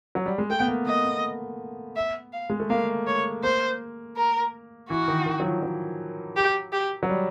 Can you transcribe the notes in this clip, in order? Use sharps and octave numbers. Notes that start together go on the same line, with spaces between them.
F#3
G3
G#3
A3 G5
B3
A#3
A#3 D#5
B3
E5
F5
G#3
A3
A#3 F5
C#5
A#3 C5
A#4
E3 F#4
D#3
D#3
F#3
F3
F#3
G4
G4
F#3
G3